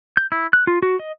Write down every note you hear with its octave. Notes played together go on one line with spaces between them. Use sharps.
G6
E4
F#6
F4
F#4
D#5